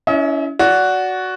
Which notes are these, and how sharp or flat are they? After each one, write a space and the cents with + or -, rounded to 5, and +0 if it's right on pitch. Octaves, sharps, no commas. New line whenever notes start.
C#4 +25 E4 +0 D#5 +45
F#4 +0 D5 -25